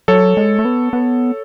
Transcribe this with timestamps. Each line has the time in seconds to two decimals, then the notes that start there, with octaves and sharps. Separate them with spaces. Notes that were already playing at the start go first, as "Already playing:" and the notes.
0.08 F#3 A4 C#5
0.37 G#3
0.59 A3
0.65 B3
0.93 B3